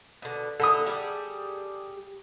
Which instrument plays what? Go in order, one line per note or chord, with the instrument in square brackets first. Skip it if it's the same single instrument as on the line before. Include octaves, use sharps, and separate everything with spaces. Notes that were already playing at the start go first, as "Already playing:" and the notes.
[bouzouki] B2 D3
[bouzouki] D3 E4 A#4 [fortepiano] A4 D#6
[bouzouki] G3 G4 G#4